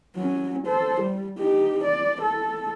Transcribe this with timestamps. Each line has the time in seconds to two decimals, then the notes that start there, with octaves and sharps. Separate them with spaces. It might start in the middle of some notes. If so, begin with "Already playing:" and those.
0.16 F#3 C#4
0.66 A4 C5
1.01 G3
1.39 D#4 G4
1.84 D5
2.22 A4